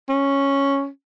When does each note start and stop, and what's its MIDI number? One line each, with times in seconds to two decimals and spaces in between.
0.09 0.87 61